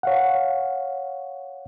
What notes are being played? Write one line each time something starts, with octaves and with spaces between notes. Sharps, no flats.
C#5 F5 F#5